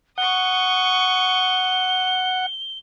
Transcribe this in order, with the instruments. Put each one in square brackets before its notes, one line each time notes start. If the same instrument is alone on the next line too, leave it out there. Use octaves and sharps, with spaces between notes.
[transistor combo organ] F#5 [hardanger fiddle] C#6 D#6 [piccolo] G7